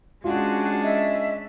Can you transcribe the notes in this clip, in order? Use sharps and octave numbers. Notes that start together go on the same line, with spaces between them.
G#3 C#4 D4 F4 F#4
D#5 E5